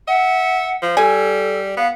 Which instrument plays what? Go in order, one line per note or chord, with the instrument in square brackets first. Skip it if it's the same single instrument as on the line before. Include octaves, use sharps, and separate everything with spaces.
[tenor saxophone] E5 [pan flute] F#5
[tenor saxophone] F3
[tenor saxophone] G3 [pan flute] A4 [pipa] G#5
[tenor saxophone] B3 [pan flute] F5